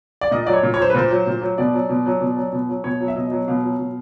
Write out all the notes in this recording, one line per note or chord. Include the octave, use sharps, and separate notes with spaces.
D5
A#2 D#5
F#3 D5
C#5
A#2
C#5
F#3 C5
B4
A#2 C5
F#3
A#2
F#3
B2 D5
F#3
B2
F#3
B2
F#3
B2
F#3
B2 C#5
F#3
E5
B2 D#5
F#3
B2 F5
F#3
B2